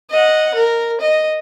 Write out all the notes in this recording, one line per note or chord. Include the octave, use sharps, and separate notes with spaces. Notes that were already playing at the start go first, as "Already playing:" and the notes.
D#5 F#5
A#4
D#5